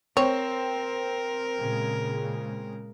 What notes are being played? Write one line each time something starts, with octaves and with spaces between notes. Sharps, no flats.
C4 A#4 C#5
A#2 C#3 G#3